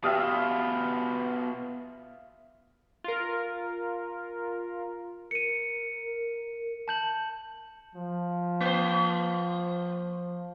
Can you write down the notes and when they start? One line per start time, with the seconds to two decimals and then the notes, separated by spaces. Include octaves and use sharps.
0.04 B2 F4 G4 E5 F5 G5 D#6
3.04 F4 A#4
5.31 A#4 C#7 D#7
6.88 A5 G6 F#7
7.95 F3
8.60 A#3 C5